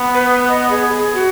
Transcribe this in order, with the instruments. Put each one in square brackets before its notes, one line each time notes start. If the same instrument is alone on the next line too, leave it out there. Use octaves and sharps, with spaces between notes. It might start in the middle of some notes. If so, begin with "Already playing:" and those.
Already playing: [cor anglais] B3
[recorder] B4
D#5
G#4
G#4
F#4